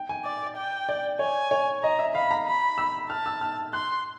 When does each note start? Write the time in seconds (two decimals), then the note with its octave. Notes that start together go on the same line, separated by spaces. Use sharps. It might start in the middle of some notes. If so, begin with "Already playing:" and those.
Already playing: G5
0.09 G#5
0.25 D5
0.57 G5
0.89 D5
1.19 C#5 G#5
1.51 C#5
1.83 D#5 A#5
1.99 E5
2.15 F5 B5
2.31 A#5
2.46 B5
2.78 E6
3.10 A5 F6
3.26 E6
3.41 F6
3.73 C6 F#6